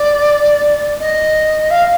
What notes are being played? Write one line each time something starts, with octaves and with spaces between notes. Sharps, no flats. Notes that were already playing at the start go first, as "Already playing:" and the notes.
Already playing: D5
D#5
F5